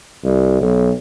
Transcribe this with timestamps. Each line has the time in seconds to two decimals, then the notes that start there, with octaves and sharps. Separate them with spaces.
0.24 C2
0.61 B1